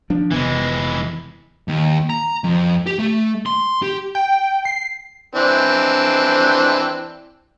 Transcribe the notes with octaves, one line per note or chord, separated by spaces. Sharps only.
F3 D4
F1 C3 E3 G#3 B3
D#2
A#5
F2
G4
A3
C6
G4
G5
C7
E3 C4 D4